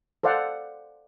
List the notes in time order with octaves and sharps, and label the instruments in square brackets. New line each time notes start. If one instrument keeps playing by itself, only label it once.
[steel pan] A4 C5 D5 F5 F#5